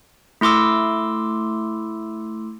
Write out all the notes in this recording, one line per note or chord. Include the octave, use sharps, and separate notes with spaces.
A3 E4 C6 D6 E6